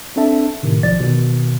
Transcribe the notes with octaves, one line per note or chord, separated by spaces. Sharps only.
C4 D4 A4 E5 A5
A2 C3 D#3
B1 F3 D5 A6
B2 D#3